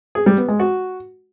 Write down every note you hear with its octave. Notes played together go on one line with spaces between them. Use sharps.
G#4
G3
B3
G#3
F#4